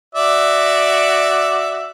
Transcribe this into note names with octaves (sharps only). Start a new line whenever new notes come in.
F#4 D5 E5